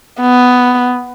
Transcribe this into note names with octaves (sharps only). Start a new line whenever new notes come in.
B3